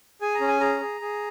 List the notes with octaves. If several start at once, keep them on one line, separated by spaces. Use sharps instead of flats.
G#4 G#5
A#5
C#4
G#5
G#4 A#5
G#4
G#4